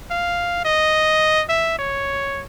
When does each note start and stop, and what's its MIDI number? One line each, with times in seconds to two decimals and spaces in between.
0.11 0.62 77
0.65 1.43 75
1.49 1.75 76
1.79 2.43 73